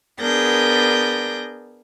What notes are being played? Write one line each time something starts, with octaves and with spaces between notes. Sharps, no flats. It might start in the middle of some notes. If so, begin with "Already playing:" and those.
B3 D4 G#4 A#4 G6 A#6